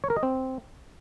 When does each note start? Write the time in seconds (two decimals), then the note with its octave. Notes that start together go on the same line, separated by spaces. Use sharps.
0.04 C#5
0.10 A#4
0.16 D#5
0.23 C4